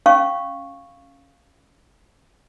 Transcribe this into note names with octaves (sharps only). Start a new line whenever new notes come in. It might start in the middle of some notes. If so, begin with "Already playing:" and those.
C#4 F5 C#6